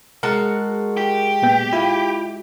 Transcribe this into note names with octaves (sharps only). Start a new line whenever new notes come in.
G#3 F#4 A#4 A5
G4
A#2 B3 G5
E4 F4